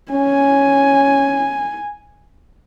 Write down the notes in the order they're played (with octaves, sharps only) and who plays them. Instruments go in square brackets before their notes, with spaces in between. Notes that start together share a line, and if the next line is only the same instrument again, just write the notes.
[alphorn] C#4 [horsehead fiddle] G#5